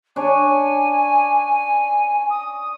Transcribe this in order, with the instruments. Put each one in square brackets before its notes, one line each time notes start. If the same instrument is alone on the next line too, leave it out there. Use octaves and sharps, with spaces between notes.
[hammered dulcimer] D4 C#5 [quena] G#5
[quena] D#6